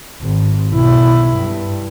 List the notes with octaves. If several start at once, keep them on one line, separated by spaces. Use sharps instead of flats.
G#1
B1 E4
G2